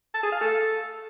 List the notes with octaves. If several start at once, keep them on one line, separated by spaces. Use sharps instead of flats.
A5
G#4
F5
A4